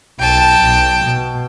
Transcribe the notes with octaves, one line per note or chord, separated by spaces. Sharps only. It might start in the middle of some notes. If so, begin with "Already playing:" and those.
B1 G5 A5
B1
B2